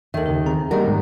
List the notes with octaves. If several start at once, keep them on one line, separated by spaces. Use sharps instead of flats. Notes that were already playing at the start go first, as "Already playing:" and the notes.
D#2 D#3 A4 E5
C#3 A#4
C4 G#4 A#5
D#3 G3 A#3 A#4 D#5 F#5
G#2 G#3 A3